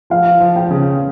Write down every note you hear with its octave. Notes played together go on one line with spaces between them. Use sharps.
F3 F5
F3
G5
C#3